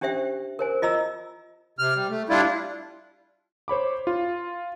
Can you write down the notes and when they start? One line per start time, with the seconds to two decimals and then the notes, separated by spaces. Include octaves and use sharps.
0.01 C#4 D4 G4 C5 E5 G5
0.59 A#4 C5 G#5
0.82 F4 D#5 A#5 E6
1.79 C3 F6
1.94 G3
2.09 A3
2.29 G3 D4 E4 F4
3.68 C5 C#5 B5 D6
4.07 F4